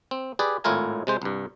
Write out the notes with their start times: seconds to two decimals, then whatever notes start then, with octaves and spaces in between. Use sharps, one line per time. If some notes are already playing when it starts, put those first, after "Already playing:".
0.11 C4
0.39 G4 G#4 B4 D5
0.64 G#1 A2 E4 F4 A#4 G#5
1.07 C3 G#3 C5
1.22 C2 G2